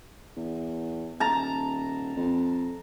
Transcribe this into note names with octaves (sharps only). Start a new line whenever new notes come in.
E2
D#1 A5 A#5
F2